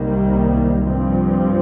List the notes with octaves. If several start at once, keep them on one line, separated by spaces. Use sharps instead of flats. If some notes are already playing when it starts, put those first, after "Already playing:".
Already playing: C2 C3 D#3 G3 A#3
G2 F3 C4